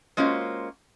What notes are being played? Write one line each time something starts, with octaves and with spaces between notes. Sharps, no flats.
G#3 A#3 C#4 F4 F#4 C5